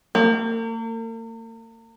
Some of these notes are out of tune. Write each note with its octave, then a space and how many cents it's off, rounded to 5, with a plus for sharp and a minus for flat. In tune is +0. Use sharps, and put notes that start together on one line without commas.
A#3 -45